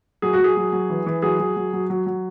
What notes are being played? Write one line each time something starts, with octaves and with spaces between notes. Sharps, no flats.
F#3 G#4
F#4
F#3
G#4
F#3
F#3
E3
E3
F#3 G#4
F#3
F#3
F#3
F#3
F#3